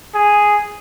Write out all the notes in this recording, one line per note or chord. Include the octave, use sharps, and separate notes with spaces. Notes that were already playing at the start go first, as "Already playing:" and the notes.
G#4